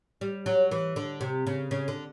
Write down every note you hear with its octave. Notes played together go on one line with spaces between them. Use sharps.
G3
F#3
E3
D3
C3
C#3
C#3
D3